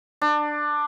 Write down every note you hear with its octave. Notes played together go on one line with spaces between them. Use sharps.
D4